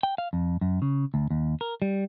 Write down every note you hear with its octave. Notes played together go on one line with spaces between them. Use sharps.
G5
F5
F2
F#2
C#3
D2
D#2
A#4
G3